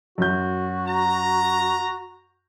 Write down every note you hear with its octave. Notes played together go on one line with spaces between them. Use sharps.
F#2 F#4 G6
A#5